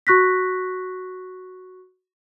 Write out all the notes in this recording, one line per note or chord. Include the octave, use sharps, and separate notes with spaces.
F#4 C#6 F#6 A#6 B6